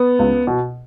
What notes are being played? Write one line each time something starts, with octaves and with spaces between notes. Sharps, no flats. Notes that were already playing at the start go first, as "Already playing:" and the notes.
Already playing: B3
C#2
B2